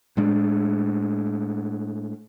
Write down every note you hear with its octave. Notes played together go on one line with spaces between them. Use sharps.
A2 G#3 D4